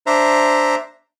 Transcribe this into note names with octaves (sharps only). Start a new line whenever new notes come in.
D4 C5 E5 A#5